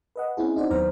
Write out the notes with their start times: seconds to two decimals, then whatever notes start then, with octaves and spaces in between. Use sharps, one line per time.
0.16 B4 D#5 F#5
0.37 C4 C#4 E4 G#4
0.56 D#4 E4 F#4 C5 D5
0.70 D#2 F#3 B3 C5 A#5 F6